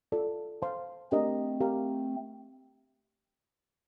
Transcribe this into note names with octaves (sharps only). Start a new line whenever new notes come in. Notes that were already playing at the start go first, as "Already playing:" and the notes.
F4 A4 D5
C5 F5 A5 C6
A3 C4 D4 G4 A#4 D#5 A#5
G4 A#4 F5 A#5